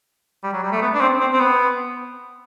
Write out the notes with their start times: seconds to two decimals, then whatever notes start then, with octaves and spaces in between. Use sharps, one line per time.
0.43 G3
0.53 F#3
0.63 G3
0.72 A3
0.82 B3
0.94 D4
1.01 C4
1.20 C4
1.33 C4
1.39 B3